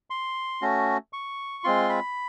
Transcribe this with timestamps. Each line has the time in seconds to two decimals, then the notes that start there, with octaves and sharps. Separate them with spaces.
0.10 C6
0.62 A3 C#4 F#4
1.13 C#6
1.64 G#3 C4 F4 C6
1.89 B5